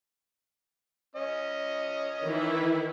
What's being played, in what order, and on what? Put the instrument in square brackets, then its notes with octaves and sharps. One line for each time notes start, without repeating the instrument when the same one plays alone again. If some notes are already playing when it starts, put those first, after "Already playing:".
[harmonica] C#4 D#5
[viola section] D#3 E3 E4